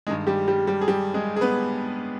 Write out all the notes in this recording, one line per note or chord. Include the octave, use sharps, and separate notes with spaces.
G2 D#3 G#3 G#4
G3 G4
G3 G4
G3 G4
G#4
G3 G4
G#3 G#4
G#4
B3 B4